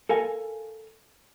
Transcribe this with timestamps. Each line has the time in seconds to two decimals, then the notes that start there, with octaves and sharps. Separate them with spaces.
0.09 A4 A#4 F5 G#5